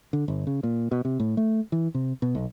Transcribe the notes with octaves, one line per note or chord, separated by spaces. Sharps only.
D3
G1
C#3
A#2
B2
C3
A2
A3
E3
C3
B2
B1